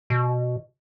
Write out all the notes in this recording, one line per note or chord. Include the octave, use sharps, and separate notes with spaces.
B2